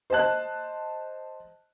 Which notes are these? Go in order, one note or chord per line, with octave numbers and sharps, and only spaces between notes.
C5 D#5 A5 F#6